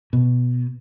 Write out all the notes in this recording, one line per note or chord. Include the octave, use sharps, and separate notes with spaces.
B2